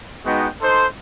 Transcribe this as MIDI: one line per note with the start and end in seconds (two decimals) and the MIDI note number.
0.25 0.47 56
0.25 0.47 59
0.25 0.47 63
0.25 0.47 66
0.25 0.47 79
0.61 0.86 63
0.61 0.86 69
0.61 0.86 72